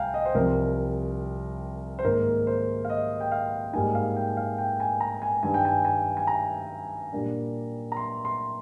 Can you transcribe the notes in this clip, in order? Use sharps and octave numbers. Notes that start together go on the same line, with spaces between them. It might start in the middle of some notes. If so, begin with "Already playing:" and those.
Already playing: C2 F5 G5 G#5 A#5
D#5
C5
C2 C3 F3 C4 A#4
C5
G#2 D#3 A#3 A#4
C5
F5
D#5
G5
F5
G#2 G3 A#3 D#4 G#5
F5
G5
F5
G5
G#5
A#5
G#5
G2 D#3 G3 G#5
G5
G#5
G#5
G#5
A#5
A#2 G3 A#3 D4
A#5
C6
C6